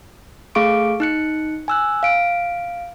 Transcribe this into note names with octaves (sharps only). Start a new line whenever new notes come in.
A3 G#4 F5 C#6 D6 D7
D#4 F#6 C#7
G#5 E6 F#6
F5 D7